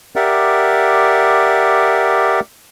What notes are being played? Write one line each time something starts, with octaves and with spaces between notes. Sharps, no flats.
G4 A#4 D5 E5 F#5